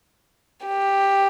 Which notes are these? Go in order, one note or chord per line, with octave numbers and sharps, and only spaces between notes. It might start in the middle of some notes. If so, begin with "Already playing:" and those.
G4